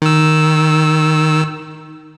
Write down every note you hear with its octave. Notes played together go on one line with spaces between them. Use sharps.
D#3 E6